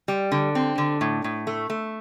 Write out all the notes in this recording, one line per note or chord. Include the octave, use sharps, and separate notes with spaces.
G3
D3
C4
D3
A2
A2
A3
A3